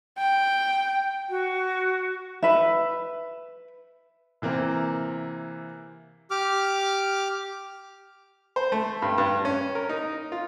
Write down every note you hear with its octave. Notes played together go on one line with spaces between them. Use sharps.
G5
F#4
B4 E5
C3 E3 A#3 C4
G4 D6 F6
C5
A3
G2
G2
C#4
A#4
D#4
F4